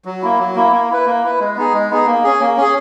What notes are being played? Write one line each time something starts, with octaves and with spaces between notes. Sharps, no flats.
F#3
A#3 E4
F#3
A#3 E4
A#3
E4 B4
A#3
E4 B4
G#3
B3 D#4 G#4
G#3
B3 D#4 G#4
A#3
C#4 G#4
A#3
C#4 G#4